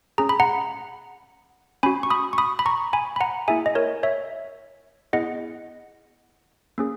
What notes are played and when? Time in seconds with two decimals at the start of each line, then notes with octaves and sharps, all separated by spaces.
0.18 C#4 G#4 A#5
0.29 B5
0.40 F#5 A#5
1.83 C#4 F#4 G#5 B5
2.03 C#6
2.10 B5 D#6
2.33 C#6
2.38 B5 D#6
2.59 B5
2.66 A#5 C#6
2.93 G#5 B5
3.16 B5
3.21 F#5 A#5
3.48 A#3 E4 G#4 E5 G#5
3.66 D#5
3.75 A#4 C#5
4.03 C#5 E5
5.13 B3 E4 G#4 D#5 F#5
6.78 A#3 C#4 G#4